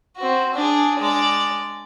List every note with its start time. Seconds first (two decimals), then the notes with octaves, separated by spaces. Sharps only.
0.17 C4 F#4
0.55 D4 G#4
0.99 G#3 D5